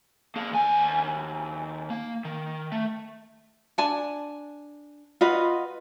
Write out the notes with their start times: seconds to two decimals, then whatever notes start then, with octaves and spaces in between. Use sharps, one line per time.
0.36 A#3 G#4
0.52 D#2 G#5
1.90 A#3
2.25 D#3
2.72 A3
3.78 D4 G#5 A5
5.21 F4 F#4 B4 D#5